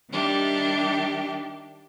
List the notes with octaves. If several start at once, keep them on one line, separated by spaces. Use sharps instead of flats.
D#3 G3 D4 G4 E5